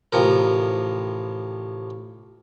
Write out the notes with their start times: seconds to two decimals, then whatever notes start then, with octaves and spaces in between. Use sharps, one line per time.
0.12 A1 C3 F3 A#4